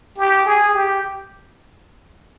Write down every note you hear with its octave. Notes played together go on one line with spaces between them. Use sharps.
G4
G#4
G4